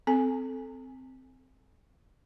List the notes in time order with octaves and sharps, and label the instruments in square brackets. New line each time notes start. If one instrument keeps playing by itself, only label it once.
[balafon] C4 A4 G#5